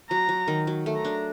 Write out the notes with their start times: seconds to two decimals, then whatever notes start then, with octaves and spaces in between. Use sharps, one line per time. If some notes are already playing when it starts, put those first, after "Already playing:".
0.10 F#3 A#5
0.29 F#3
0.48 D#3
0.67 F#3
0.86 A3
0.96 A#5
1.05 D4